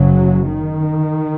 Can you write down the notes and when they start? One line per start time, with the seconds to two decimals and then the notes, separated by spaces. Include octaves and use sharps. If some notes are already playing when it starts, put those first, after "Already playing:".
Already playing: F#1 F#2 C#3 F#3
0.48 D#3